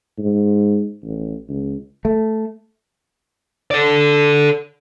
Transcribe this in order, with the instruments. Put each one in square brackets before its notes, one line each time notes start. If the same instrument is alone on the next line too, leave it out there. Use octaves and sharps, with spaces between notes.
[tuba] G#2
A1
C#2
[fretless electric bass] A3
[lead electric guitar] A4 D5